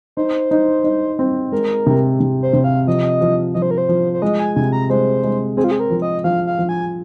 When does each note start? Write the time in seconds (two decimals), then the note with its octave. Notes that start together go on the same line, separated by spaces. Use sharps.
0.17 D#4 C5
0.51 D#4
0.84 D#4
1.19 C4
1.52 G#3 A#4
1.86 C3
2.20 C3
2.42 C5
2.53 C3
2.64 F5
2.87 F3 D#5
3.21 F3
3.54 F3 D#5
3.62 C5
3.71 A#4
3.78 C5
3.89 F3
4.14 C5
4.22 G#3 D#5
4.39 G#5
4.56 C3 G#5
4.72 A#5
4.90 G#3 C5
5.24 G#3
5.57 C4 G#4
5.64 F4
5.71 G#4
5.80 A#4
5.90 F3
6.02 D#5
6.24 F3 F5
6.47 F5
6.59 F3
6.69 G#5